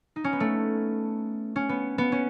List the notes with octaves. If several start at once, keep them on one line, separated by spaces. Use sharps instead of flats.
D#4
C#4
B3
A3
C#4
B3
B3
C#4